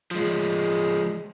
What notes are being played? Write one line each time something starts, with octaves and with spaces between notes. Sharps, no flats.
F3 G#3